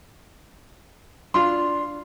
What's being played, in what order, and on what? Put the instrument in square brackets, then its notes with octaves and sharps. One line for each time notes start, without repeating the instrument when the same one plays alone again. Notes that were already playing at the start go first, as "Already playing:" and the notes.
[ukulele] D4 F4 [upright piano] C6